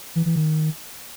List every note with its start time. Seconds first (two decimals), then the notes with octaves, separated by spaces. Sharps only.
0.16 E3
0.26 E3
0.36 D#3